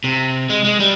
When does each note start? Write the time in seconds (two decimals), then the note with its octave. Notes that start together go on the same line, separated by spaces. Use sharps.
0.04 C3
0.49 G#3
0.65 G#3
0.80 G3